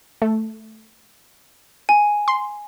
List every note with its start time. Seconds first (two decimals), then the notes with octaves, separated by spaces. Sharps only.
0.22 A3
1.89 G#5
2.28 C6